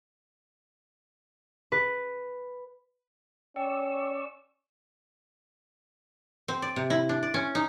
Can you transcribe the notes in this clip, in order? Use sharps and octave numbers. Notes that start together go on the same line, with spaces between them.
B4
C#4 D5 G5 C#6 E6
C4
D5
C3
E4
D4
D5
C#4
D#4